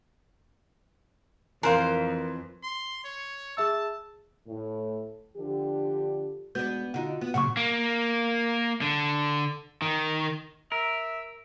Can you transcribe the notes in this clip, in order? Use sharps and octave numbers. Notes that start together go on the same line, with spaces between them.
F2 E3 A#4 C5 F5
C6
C#5
G#4 E5 A5 E6
A2
D3 F3 D4 G4
G#3 B3 D4 F#4 G6
D3 D#4 F4 F#4 F#5
B3
A#2 C#3 F#3 F#5 C#6
A#3
D3
D#3
A#4 E5